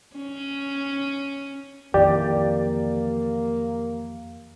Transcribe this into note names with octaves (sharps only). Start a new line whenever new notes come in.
C#4
F2 D#3 E3 A#3 G4 D5